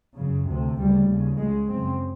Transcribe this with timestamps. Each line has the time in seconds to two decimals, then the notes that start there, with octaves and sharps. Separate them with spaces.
0.17 F#2 C#3
0.46 D2 C3
0.77 D2 C#3 G3
1.08 D#2 C#3
1.37 C#2 C#3 G#3
1.68 F#2 C#3 C4